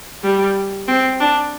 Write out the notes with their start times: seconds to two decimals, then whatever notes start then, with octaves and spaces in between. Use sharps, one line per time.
0.24 G3
0.88 C4
1.21 D4